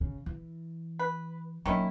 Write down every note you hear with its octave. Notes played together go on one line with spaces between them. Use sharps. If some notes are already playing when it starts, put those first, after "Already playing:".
C#3
E3
B4
D#3 F#3 A#3 C#4 E4